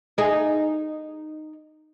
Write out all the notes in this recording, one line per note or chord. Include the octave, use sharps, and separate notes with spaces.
D#4 G#4